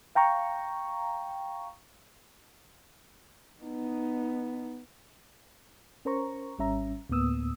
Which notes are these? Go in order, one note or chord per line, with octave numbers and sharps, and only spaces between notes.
F5 G5 A#5 C#6
B3 D#4
C#4 A#4 C5 A#5 C#6
G#1 G3 C#4 E5 A#5
D2 A2 A#3 B3 D#6 E6